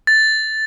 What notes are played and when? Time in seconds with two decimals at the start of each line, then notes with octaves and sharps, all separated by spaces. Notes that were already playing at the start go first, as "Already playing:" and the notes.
0.07 A6